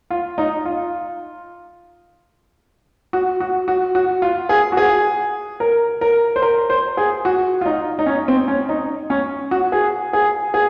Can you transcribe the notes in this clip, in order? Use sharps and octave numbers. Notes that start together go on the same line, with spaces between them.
F4
D#4
F4
F#4
F#4
F#4
F#4
F4
G#4
F#4
G#4
A#4
A#4
C5
A#4
C5
G#4
F#4
F4
D#4
D#4
C#4
C4
C#4
D#4
C#4
F#4
G#4
G#4
G#4